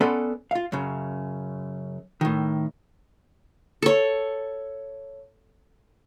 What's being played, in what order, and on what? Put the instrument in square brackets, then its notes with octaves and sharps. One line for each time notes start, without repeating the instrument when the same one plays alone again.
[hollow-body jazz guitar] B3 C#4 A4 B4 D5 C6
F4 F5
F#2 C#3
A2 D#3
[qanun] A4 C#5